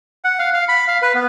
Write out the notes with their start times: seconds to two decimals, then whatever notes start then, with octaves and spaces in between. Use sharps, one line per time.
0.25 F#5
0.39 F5
0.54 F5
0.69 B5
0.88 F5
1.02 B4
1.14 B3